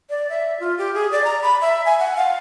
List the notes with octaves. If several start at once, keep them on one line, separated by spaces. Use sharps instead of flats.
D5
E5
F4
G4
G#4
D5
A#5
B5
E5
G#5
F#5
F5